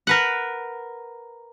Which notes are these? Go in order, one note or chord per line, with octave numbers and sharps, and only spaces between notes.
A#4 B4 F#5